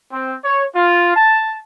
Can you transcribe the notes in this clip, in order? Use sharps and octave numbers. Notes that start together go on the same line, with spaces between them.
C4
C#5
F4
A5